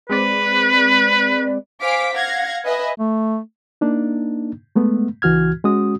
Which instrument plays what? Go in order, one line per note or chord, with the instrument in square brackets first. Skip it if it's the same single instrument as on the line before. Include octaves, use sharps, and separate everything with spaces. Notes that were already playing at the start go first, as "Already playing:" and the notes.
[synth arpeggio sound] G#3 C4 D5 [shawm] B4
[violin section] C5 F5 G#5 D6 B6 D7
F5 F#5 G#6 A#6
B4 D#5 E5 G#5
[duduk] A3
[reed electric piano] A#3 D4 D#4
G#3 A3 B3
C#2 E3 F#4 F6 G#6
G#3 C#4 F#4 D#6